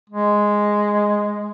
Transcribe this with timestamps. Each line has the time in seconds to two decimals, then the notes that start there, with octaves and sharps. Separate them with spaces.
0.10 G#3